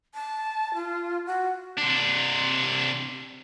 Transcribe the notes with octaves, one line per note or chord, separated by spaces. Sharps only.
A5
F4
F#4
C3 D4